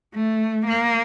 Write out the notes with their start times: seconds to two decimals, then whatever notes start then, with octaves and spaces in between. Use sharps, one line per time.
0.15 A3
0.67 A#3